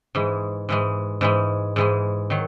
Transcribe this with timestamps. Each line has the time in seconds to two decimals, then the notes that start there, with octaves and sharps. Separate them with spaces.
0.15 G#2 E3 G#3
0.69 G#2 E3 G#3
1.21 G#2 E3 G#3
1.76 G#2 E3 G#3
2.30 D#3 F#3